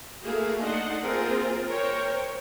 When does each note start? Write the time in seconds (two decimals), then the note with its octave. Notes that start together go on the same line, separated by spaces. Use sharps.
0.24 A3 A#3 E4 F#4 G#4 F5
0.62 D4 D#4 D#5 F#5 C6
1.01 A#3 C4 F4 G#4 A#4
1.68 A#4 C5 C#5 G5